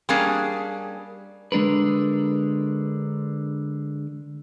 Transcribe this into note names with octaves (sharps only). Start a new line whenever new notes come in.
G3 A#3 C#4 D4 G#4
D3 G#3 D4 A#4 B4